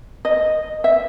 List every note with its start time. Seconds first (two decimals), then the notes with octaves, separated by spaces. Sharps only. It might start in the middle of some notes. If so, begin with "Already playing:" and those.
0.25 D#5
0.84 E5